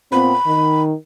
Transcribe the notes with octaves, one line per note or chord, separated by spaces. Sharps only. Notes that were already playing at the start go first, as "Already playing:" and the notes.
A#2 B3 C4 B5
D#3